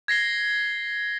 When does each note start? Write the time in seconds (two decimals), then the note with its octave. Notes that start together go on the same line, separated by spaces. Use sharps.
0.08 G#6 A#6 C7 G7